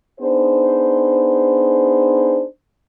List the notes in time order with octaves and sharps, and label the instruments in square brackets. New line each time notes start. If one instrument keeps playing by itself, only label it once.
[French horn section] B3 D4 D#4 G#4 C5